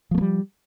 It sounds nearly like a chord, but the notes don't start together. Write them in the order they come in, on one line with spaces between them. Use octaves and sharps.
F3 A3 A#3 G3